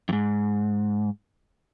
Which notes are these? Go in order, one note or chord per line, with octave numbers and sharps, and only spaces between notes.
F2 G#2